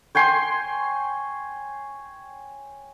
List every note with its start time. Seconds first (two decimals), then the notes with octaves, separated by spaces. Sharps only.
0.15 C#5 G5 G#5 C6